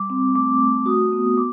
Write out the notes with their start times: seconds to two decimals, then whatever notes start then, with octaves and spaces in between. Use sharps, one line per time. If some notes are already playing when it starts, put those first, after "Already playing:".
Already playing: G3 D6
0.10 C4
0.35 A3 D6
0.60 A3
0.86 F#4 D#6
1.13 B3
1.38 D6